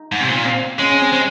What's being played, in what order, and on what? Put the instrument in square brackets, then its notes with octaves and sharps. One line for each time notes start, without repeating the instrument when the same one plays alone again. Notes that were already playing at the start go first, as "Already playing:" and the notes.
Already playing: [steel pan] D#4
[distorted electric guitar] G#2
C3
A#2
[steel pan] C4
[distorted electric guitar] G#3 [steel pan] C#4
[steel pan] C#4
C4
[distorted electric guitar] G#3